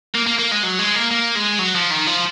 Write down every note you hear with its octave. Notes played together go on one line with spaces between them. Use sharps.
A#3
A#3
A#3
G#3
F#3
G#3
A#3
A#3
G#3
F#3
F3
D#3
F3